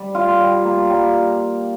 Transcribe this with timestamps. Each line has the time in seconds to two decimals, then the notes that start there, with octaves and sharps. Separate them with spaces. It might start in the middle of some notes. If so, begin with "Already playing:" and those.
Already playing: G3
0.15 F4
0.40 G3
0.64 A#3
0.90 G3